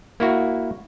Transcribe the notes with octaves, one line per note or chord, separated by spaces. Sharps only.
A#3 E4 F#4